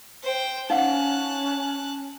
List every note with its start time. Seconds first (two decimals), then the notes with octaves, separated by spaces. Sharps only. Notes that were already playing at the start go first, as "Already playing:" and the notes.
0.24 C5 G5
0.70 C#4 D#4 F5 F#5 A5 F#6